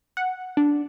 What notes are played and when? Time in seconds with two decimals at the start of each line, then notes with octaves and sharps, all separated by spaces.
0.17 F#5
0.57 D4